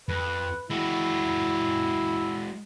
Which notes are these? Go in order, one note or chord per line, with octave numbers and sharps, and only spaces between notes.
F2 B4
G#3 E4 F#4